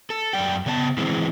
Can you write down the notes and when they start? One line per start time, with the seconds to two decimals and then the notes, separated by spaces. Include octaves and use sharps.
0.10 A4
0.33 F#2 D5 G5
0.66 C#3 B3 C#5 A5
0.97 E3 G#3 C4